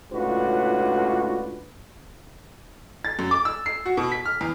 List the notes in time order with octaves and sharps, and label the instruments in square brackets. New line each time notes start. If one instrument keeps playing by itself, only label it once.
[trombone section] C#2 A2 D4 F4 F#4 B4
[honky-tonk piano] A6
F#2
D6
E6
C7
F#4
B2
B6
F6
E2